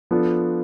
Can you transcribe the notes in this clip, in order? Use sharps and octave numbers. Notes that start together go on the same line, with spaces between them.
F3 B3 D4 F4 A4